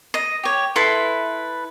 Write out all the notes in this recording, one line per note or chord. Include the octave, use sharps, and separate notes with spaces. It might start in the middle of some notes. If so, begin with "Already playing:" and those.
D#5
G4 C#5
E4 A4 B4 C6